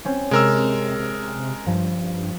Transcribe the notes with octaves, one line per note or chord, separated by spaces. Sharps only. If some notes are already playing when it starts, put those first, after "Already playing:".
C4 C#4 C5
C3 G#3 A#4 E6
C3
G2 F3